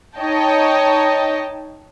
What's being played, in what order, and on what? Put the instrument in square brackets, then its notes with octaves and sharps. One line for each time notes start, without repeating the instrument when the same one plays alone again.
[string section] D#4 C#5 D#5 G5 A5